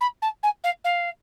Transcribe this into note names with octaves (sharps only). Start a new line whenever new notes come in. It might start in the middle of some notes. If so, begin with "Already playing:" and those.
B5
A5
G#5
F5
F5